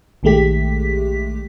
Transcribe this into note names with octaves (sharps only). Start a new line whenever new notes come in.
A#1 D#3 G#3 A3 G4 B6